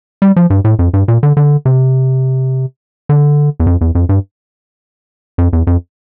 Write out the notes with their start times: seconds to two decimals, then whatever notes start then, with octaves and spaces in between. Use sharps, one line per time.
0.22 G3
0.36 F3
0.50 G2
0.64 A2
0.79 F2
0.94 G2
1.08 A#2
1.23 D3
1.37 D3
1.65 C3
3.09 D3
3.60 E2
3.67 F2
3.81 E2
3.95 F2
4.09 G2
5.38 F2
5.53 E2
5.67 F2